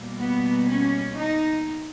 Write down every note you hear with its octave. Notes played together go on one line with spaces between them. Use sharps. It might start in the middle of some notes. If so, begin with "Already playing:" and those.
Already playing: B2 G3 A#3
B3
C#4
D#4